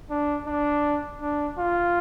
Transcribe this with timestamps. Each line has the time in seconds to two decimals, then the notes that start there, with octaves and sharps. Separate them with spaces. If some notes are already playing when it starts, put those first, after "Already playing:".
0.11 D4
0.47 D4
1.22 D4
1.58 F4